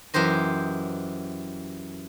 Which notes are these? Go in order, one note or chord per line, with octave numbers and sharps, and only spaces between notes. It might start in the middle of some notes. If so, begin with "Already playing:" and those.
F#2 E3 G4 C5 D#5